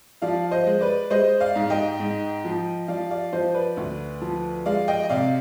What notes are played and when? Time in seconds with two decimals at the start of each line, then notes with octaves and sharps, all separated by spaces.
0.22 F3 D5 F5
0.51 C5 D#5
0.67 G#3
0.81 B4 D5
1.10 G#3 C5 D#5
1.40 D5 F5
1.56 G#2
1.70 D#5 G5
2.00 G#2
2.44 F3
2.88 F3 D5 F5
3.10 D5 F5
3.33 F3 C5 D#5
3.54 B4 D5
3.77 D2
4.21 F3
4.66 G#3 D5 F5
4.88 D#5 G5
5.03 D#5
5.09 C3 D5 F5